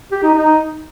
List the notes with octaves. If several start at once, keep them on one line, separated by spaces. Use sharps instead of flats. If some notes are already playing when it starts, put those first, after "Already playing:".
G4
D#4
D#4